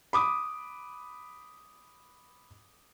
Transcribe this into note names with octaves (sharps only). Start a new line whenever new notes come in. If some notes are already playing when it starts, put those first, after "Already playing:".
B5 D6 D#6